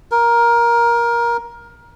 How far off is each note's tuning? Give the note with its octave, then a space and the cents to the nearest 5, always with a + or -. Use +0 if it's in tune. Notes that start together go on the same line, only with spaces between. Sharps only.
A#4 +15